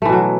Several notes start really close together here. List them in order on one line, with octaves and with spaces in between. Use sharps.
A3 E3 B2 F#3